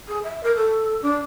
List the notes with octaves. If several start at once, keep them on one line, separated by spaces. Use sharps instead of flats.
G#4
E5
A#4
A4
D4